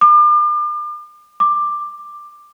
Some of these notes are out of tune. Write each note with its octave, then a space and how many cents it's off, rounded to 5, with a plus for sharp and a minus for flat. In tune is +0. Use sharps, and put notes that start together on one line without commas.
D6 +40
D6 +10